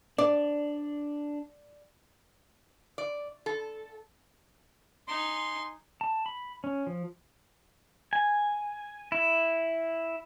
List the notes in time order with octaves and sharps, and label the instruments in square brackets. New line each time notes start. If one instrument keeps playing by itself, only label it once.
[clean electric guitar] D4 [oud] D5
[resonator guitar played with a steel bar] D5
A4
[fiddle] D#4 G#5 [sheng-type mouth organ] C6
[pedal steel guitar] A5
B5
C#4
F3
G#5
E4